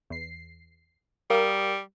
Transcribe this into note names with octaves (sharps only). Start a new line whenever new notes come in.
E2 C7
G3 A#4 F5 D#6